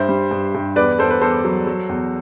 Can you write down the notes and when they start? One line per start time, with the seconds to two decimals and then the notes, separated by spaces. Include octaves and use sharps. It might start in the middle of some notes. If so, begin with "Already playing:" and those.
Already playing: G2 C5 E5
0.09 G3
0.31 G2
0.55 G2
0.76 E2 B4 D5
0.99 E2 A4 C5
1.10 B4
1.21 E2 A4 C5
1.44 F#3
1.67 F#3
1.89 E2